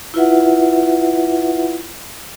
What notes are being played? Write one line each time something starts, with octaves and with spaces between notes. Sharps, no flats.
E4 F4 B4 E5 F#5